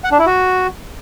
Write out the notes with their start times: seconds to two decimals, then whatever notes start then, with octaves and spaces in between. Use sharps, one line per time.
0.04 F#5
0.11 D4
0.19 E4
0.26 F#4